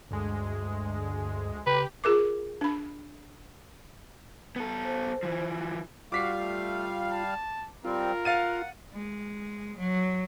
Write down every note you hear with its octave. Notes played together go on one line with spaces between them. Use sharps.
D2 G2 G#3
C#3 G4 B4
F4 G#4 A#4 D6
D4 B5
B3 A4
C5
E3 F3
G3 F4 F#4 F5 D6 B6 C7
A3
A5
G3 C4 F4 A#4
F5 F#5 A6 D#7
G#3
F#3